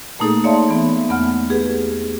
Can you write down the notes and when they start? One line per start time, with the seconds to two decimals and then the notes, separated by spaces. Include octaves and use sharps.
0.19 A#2 A3 A#3 D#4 G#4 A4
0.44 C#5 D5 E5 F5 A5 C6
0.68 E3 B3
1.09 E2 A3 B3 F#5 F6
1.49 G4 G#4 B4